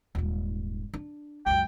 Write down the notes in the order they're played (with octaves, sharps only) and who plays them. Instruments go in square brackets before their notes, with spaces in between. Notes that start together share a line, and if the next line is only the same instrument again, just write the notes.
[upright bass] D#1 G#2
D4
[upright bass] C#2 F#2 [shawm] G5